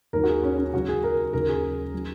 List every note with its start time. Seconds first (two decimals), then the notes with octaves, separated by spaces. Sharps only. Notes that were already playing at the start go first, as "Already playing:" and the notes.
0.13 D#2 D#3 F#3 A#4
0.24 F#4
0.29 G#4
0.43 C#4
0.58 C#4
0.73 C#2 C#3 F#3 F#4
0.88 G#4
1.03 A#4
1.33 D#2 C#3 F#3 A#4
1.49 G#4
1.94 F#3